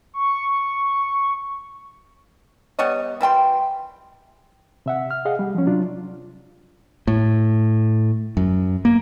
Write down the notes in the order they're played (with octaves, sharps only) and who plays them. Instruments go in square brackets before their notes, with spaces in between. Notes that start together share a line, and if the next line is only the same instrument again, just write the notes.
[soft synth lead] C#6
[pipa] G3 B3 C#5 D#5
E3 G3 G5 C6
[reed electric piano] C3 E5 F#5
F6
G#4 D#5 F5 F#5
G3
F3 C#4
C3 F#3 D4 F4
[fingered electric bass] A2
F#2
A#3